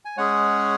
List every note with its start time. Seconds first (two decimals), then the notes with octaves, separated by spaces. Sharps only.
0.05 G#5
0.17 G#3 C#4 G#4 C#5 F#5